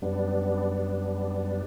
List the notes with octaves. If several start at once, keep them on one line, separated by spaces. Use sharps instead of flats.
F#2 G3 B3 D4